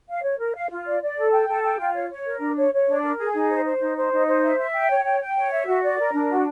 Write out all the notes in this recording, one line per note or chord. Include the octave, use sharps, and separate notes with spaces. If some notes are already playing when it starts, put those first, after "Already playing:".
F5
C#5
A#4
F5
F4
D5
D5
A4
G5
A4
G5
F4
C#5
C#5
A#4
D4
C#5
C#5
D4
A#4
G#4
D#4
C5
C5
D#4
C5
D#4
C5
E5
E5
G5
C#5
G5
G5
C#5
E5
F#4
D5
A#4
D4
F#4